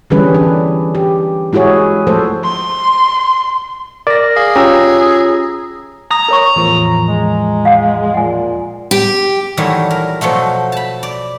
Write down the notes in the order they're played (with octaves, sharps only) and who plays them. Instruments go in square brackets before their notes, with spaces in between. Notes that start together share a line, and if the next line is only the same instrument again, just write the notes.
[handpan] D3 E3 G3 C#4 G#4 B4
D4
G4
G#3 E4 F#4 G#4 C#5
F3 A3 A4 C5
[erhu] C6
[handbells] A#4 A#6 [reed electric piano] D5
[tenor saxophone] G#4 [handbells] F5
[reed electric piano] C#4 G4 [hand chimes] F4 C#5 A#6 [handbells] A#5 E6
[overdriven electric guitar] A#5 [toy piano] D#6
[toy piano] A#4 C#5 C#6
[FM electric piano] E2 A2 F3
[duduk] G#3
[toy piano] F5 F#5
[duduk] A#2 [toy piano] F#5 G#5
[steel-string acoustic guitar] G4
[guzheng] A#2 D#3 E3 F#3 G3 A3
A#4
B2 F3 F#3 A3
A5 B5
D5